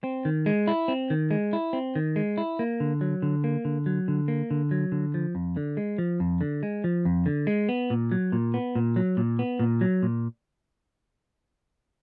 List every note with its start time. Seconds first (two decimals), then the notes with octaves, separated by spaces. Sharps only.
0.04 C4
0.25 D#3
0.46 G#3
0.67 E4
0.88 C4
1.10 D#3
1.31 G#3
1.53 E4
1.73 C4
1.95 D#3
2.16 G#3
2.38 E4
2.59 A#3
2.80 D3
3.01 F#3
3.22 D3
3.44 A#3
3.65 D3
3.86 F#3
4.08 D3
4.28 A#3
4.51 D3
4.71 F#3
4.92 D3
5.14 F3
5.35 F2
5.57 D3
5.77 G#3
5.98 F3
6.20 F2
6.41 D3
6.63 G#3
6.84 F3
7.05 F2
7.26 D3
7.47 G#3
7.69 B3
7.90 A#2
8.11 F#3
8.32 A#2
8.54 B3
8.75 A#2
8.96 F#3
9.17 A#2
9.39 B3
9.60 A#2
9.81 F#3
10.02 A#2